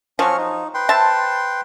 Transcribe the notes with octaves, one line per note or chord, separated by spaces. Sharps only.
F3 F#3 C#4 C#6 F6
D#4
B4 G5 C6
C5 E5 A5